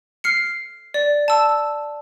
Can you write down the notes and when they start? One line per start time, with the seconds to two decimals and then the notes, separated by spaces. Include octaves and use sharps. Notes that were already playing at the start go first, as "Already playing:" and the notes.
0.24 F6 C7 C#7
0.94 D5
1.28 A5 E6